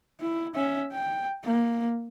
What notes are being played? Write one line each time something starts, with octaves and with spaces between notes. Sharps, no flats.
E4
C#4 E5
G5
A#3